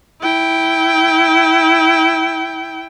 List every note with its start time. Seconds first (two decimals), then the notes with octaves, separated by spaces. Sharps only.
0.21 E4 G5